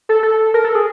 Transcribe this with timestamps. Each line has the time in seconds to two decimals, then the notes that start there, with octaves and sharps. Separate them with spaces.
0.09 A4
0.23 A4
0.54 A#4
0.64 A4
0.75 G#4